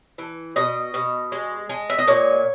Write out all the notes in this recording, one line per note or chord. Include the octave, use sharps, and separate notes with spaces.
E3
B2 D#5
B2
G#3
G#3
E5
D#5
A#2 C#5